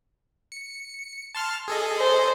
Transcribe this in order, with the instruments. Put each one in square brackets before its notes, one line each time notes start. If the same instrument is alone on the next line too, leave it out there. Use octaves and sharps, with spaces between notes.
[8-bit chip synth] C#7
A5 C6 F6
G#4 A4 D#5
[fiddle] C5